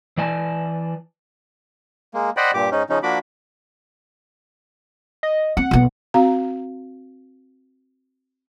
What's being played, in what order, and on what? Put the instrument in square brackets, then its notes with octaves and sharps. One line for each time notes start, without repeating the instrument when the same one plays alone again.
[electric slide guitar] E3 D5 G#5 A5
[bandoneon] G#3 A#3
C5 D5 D#5 F#5 G5 B5
G2 A#2 G4 D6
G#2 C#4 D#4
C#3 F3 C#4 D#4
F3 A#3 D4 F#4 B5 D6
[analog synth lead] D#5
[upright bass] C4 [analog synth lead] F#5
[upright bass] B1 B3
[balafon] C4 F#4 F5 A#5